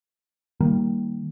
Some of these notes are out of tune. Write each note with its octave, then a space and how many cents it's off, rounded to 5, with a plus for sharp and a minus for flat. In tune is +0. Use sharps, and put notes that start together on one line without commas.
D#3 +0 G3 +5 A#3 +0